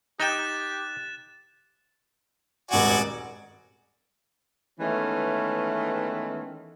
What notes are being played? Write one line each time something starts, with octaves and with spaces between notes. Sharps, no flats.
D#4 G4 D#5 G5 F#6 A6 E7
D#1 G#1 F#4 D5 F#5 G#5
D#3 E3 G#3 A3 B3 C#4